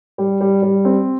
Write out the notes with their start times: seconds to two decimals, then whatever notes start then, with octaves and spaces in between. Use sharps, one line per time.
0.18 G3
0.41 G3
0.63 G3
0.85 C4